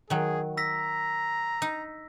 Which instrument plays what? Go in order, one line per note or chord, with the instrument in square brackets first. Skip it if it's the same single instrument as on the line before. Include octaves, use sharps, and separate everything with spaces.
[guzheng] D#3 F#3 [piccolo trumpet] G#4
[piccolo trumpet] A#5 [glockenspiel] E6 A#6 B6
[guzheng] D#4